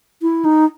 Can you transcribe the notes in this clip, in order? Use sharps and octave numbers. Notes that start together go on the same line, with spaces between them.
E4
D#4